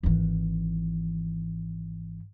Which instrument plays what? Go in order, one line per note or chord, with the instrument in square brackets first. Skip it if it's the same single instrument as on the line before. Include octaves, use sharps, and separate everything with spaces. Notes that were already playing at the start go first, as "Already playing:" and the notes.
[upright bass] G#1 E3